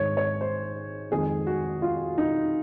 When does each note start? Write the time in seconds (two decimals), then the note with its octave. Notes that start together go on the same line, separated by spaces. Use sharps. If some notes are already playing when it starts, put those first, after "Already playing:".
Already playing: G#1 G#2 D#3 G#3 C#5
0.17 C#5
0.41 C5
1.11 F2 D#3 G#3 G#4
1.47 F#4
1.82 F4
2.18 D#4